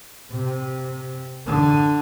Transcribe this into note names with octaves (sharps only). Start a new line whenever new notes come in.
C3
D3